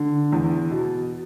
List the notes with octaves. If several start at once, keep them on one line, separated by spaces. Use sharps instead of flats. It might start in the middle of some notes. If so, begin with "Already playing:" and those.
Already playing: D3
E2
B2